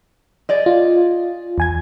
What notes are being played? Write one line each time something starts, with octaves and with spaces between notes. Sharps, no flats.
G#4 D5 D#5
F4
E2 G#5 G#6